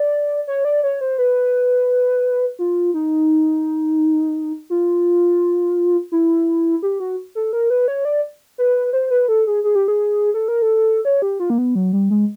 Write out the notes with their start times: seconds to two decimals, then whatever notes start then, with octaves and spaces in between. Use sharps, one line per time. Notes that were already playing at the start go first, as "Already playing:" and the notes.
Already playing: D5
0.47 C#5
0.65 D5
0.83 C#5
1.01 C5
1.18 B4
2.59 F4
2.94 D#4
4.70 F4
6.12 E4
6.83 G4
7.00 F#4
7.35 A4
7.53 A#4
7.70 B4
7.88 C#5
8.05 D5
8.58 B4
8.93 C5
9.10 B4
9.28 A4
9.47 G#4
9.64 G#4
9.75 G4
9.88 G#4
10.34 A4
10.48 A#4
10.62 A4
11.05 C#5
11.22 G4
11.40 F4
11.50 A#3
11.58 B3
11.75 F#3
11.93 G3
12.11 G#3